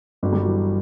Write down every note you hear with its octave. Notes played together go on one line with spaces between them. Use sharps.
G1 F#3
G3
E3 F#3